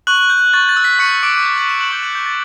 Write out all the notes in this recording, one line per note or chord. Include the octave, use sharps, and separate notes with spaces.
C#6 F#6 F#7
G6
C#6 A6
A6
E6
B6
C#6 F#6 C#7
D6 D7
D6 G6 D7
F#6 F#7
E6 E7
F#6 F#7
C#6 G6 G7
F#6 F#7
C#6 G6
A6